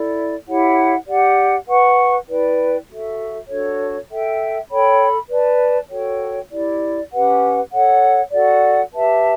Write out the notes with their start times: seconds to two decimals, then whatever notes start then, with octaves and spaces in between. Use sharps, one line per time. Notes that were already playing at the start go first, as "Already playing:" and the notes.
Already playing: E4 A4 D5
0.46 E4 G4 C#5 F#5
1.06 G4 D5 F#5
1.67 B4 F#5 C#6
2.27 E4 B4 D5 G5
2.88 F#4 A4 E5
3.49 D4 F#4 A4 C#5
4.10 A4 E5 G5
4.70 A4 C#5 G5 B5
5.30 B4 D5 A5
5.90 F#4 A4 C#5 G5
6.51 E4 G4 D5
7.11 C#4 G4 B4 F#5
7.72 A4 C#5 F#5
8.32 F#4 A4 D5 F#5
8.93 G4 B4 E5 A5